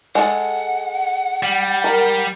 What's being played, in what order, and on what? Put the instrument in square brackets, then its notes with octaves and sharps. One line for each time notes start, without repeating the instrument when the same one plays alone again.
[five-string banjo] G#3 A4 [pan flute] F#5
[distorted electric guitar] G3
[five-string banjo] A#4